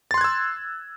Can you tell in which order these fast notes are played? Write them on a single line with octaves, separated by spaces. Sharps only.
A6 C6 F#6 G#6 E6